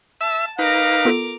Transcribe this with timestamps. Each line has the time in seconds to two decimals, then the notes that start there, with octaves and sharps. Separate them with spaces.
0.21 E5 A5 E6
0.59 D#4 A#4 B4 F5 A#5 D6
1.05 B3 F4 A4